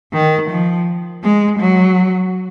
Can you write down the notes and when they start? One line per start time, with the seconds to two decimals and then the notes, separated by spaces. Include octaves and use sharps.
0.13 D#3
0.50 F3
1.23 G#3
1.59 F#3